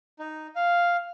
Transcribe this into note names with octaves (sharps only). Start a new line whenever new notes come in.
D#4
F5